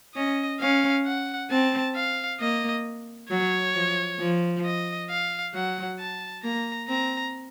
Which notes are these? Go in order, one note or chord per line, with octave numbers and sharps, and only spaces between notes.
C#4 D#5
C#4 F5
F#5
C4 A5
F5
A#3 D#5
F#3 C#5
F3
F3
D#5
F5
F#3 F#5
A5
A#3 A#5
C4 A#5